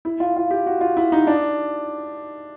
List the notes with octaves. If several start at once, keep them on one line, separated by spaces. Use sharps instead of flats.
E4
F4
F4
G4
F#4
F4
E4
D#4
D4